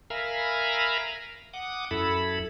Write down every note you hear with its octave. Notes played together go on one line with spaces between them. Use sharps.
A#4 E5 F5 G#5 A#5 B5
F#5 D6 D#6
F#2 E4 A4 B5